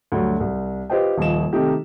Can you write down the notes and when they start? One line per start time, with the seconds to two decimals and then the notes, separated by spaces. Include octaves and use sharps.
0.12 D2 G2 F#3
0.40 C2
0.90 F4 G4 B4 C5 D#5 G5
1.18 D#1 F3 D#5 E7
1.53 C3 D#3 A3 D#4 G4